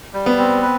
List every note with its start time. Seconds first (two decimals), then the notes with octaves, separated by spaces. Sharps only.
0.13 G3
0.26 B3
0.38 C4
0.62 B4